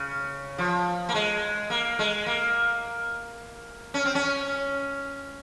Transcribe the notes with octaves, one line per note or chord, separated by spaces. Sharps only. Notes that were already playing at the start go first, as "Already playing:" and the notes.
Already playing: C#3
F3
A#3
G#3
A#3
G#3
A#3
C#4
C4
C#4